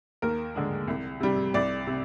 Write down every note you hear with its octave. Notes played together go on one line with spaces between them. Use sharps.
D#2 A#4
D3 G#3
C2
C3 G3
C2 D5
C3